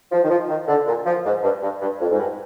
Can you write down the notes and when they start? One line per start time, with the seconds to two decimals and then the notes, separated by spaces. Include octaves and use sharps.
0.11 F3
0.24 D#3
0.29 F3
0.49 D#3
0.68 D3
0.86 A#2
1.06 F3
1.25 G#2
1.43 G2
1.62 G2
1.81 G2
2.00 F2
2.11 G#2
2.19 G2